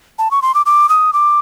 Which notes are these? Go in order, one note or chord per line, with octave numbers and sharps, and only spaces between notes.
A5
C#6
C6
D6
D6
D#6
D6